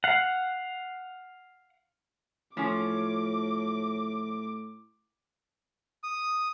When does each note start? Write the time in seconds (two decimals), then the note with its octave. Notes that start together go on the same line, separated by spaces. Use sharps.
0.04 F5 F#5
2.57 A2 F3 C#4 D6
6.03 D#6